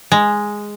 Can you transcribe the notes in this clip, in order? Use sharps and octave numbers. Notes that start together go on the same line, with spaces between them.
G#3